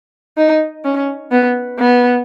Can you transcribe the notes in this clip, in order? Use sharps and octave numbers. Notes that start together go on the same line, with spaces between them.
D#4
C#4
B3
B3